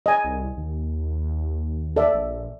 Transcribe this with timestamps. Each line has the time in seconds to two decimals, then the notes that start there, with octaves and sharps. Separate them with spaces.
0.06 D#5 G#5
0.24 C2
0.57 D#2
1.96 A4 D5 E5
2.14 A#1